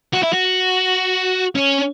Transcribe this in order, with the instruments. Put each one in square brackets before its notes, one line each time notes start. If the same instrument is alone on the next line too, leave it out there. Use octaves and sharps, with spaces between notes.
[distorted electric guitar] F#4
E4
F#4
C#4